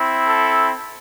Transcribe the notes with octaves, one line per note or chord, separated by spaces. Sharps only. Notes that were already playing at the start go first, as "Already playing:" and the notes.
Already playing: C4 E4
A4